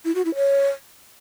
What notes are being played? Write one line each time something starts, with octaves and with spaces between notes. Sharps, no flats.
E4
F#4
E4
C#5